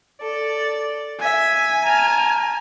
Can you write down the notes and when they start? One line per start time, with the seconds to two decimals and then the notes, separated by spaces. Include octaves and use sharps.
0.21 A4 D5
1.20 E5 G#5
1.83 A5 A#5 F6